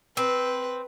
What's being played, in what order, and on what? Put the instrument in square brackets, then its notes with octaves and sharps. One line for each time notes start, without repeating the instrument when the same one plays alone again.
[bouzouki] C4 [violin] B4